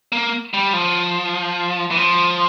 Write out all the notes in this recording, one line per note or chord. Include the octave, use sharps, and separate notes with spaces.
A#3
G3
F3
E3
F3